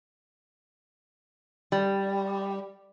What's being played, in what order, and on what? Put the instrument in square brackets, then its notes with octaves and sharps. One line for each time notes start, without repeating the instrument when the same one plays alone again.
[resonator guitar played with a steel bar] G3